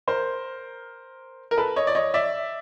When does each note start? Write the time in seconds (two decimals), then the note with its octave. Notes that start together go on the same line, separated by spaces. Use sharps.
0.07 A#4 C5
1.51 A#4
1.58 A4 B4
1.76 C#5 D#5
1.87 D5
1.95 C#5 D#5
2.14 D5 E5